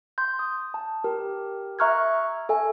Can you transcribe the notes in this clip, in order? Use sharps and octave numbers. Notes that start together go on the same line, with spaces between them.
C6 G6
D#6
A5
G4 A#4
E5 A#5 C#6 F6 F#6 G#6
A4 E5 G#5